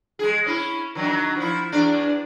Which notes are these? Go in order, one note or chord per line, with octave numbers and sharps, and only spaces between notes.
G#3 G#4
C#4 E4
D#3 F#3 D4
F3 E4
E2 D4